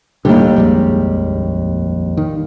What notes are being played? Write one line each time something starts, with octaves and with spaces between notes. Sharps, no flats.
E1 D#2 A2 D3 G3
A#1 F2 G#3
D#3